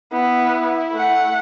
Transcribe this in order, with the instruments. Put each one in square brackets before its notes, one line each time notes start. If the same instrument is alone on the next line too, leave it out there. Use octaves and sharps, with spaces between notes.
[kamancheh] B3 [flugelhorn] E4
[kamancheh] A3 F#5